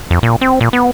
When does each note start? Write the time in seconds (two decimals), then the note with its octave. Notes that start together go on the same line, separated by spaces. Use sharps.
0.11 F2
0.23 A#2
0.41 C4
0.61 A#2
0.73 B3